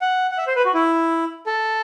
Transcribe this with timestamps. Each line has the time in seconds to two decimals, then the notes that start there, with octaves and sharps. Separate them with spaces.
0.02 F#5
0.31 F#5
0.38 E5
0.47 C5
0.56 B4
0.65 F#4
0.74 E4
1.47 A4